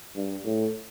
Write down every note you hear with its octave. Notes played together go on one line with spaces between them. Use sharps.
G2
A2